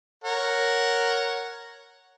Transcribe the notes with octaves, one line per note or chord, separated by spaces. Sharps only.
A#4 C#5 F#5